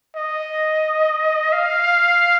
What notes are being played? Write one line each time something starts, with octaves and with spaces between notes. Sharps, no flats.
D#5
F5